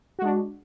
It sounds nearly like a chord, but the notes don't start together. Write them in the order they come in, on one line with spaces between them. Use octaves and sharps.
F#4 G#3 D4